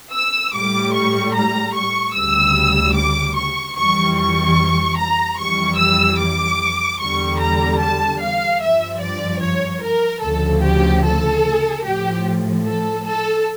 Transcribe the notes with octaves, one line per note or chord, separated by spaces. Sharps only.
E6
A2 G3 D6
C#6
A#5
C#6
D2 C#3 G3 E6
D6
C#6
F2 E3 G3 C#6
C#6
A#5
F2 E3 G3 C#6
E6
D6
E2 D3 G3 C#6
A#5
A5
F5
G2 F3 E5
D5
C#5
A#4
D2 C#3 F3 A4
G4
A4
A2 F3 G4
A4
A4